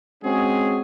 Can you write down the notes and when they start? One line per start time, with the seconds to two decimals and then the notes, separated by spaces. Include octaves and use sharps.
0.23 G#3 C4 C#4 F#4 G#4